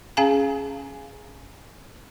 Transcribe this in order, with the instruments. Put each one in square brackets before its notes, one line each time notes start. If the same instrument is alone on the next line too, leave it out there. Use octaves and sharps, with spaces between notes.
[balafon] C#4 G#4 F5 G#5 A#5